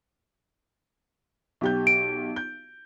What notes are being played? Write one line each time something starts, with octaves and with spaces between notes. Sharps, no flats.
B1 G4 G6
D7
G6